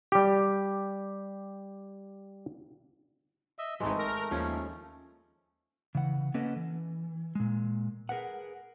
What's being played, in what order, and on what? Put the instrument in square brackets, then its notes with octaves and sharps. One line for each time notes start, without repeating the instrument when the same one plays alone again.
[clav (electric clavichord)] G3 G4
[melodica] D#5 E5
[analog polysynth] G#1 G#2 E3 [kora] G#3 D#4 [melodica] A3
[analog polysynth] A#4
[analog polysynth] D#2 [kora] F3 C#4
[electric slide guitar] C#3 E3 F#5
A#3 C#4 A4 B4 D#5 F#5
E3
A#2 G#3
G#4 A#4 B4 F#5